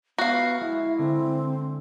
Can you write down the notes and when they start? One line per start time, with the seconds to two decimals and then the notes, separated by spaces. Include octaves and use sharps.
0.19 B3 F#4 F5
0.60 G#3 E4 E5
0.98 D3 C4